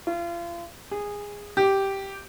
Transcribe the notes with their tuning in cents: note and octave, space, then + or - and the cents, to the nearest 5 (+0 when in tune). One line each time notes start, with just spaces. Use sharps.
F4 -35
G#4 -15
G4 -5